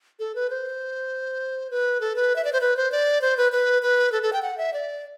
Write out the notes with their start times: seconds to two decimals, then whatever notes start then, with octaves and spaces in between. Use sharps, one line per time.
0.19 A4
0.35 B4
0.50 C5
1.71 B4
2.01 A4
2.16 B4
2.36 E5
2.45 D5
2.53 C5
2.61 B4
2.77 C5
2.92 D5
3.22 C5
3.37 B4
3.52 B4
3.82 B4
4.12 A4
4.23 A4
4.33 G5
4.42 F#5
4.58 E5
4.73 D5